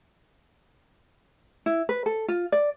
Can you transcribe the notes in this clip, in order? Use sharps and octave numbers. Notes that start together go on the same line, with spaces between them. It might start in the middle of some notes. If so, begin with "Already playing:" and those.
E4
B4
A4
F4
D5